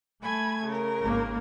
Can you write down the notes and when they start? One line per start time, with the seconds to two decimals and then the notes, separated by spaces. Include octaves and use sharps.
0.22 A3 G#5 B5 G#6
0.66 C#3 A#4
1.02 G#1 A#3